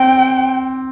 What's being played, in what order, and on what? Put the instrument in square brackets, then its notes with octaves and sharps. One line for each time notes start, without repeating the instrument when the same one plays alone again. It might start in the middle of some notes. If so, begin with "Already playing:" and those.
Already playing: [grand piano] C4 [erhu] G5